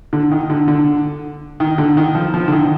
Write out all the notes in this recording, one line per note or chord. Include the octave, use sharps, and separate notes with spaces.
D3
D#3
D3
D3
D#3
D3
D#3
F3
F3
D3
D#3